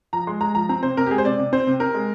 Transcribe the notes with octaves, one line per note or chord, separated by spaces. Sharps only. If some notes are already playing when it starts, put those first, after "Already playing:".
F3 A#5
G#3 C6
G#3 A#5
F3 A#5
C4 A#5
C3 C5
C3 A#4
G4
G#3 G#4
C5
C3 D5
C3
C4 C5
C3
C4 A#4
G#3